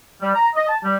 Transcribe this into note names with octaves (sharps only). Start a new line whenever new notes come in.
G3
A#5
D#5
A5
G3